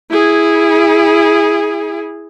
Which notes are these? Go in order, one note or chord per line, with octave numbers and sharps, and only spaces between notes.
E4 G#4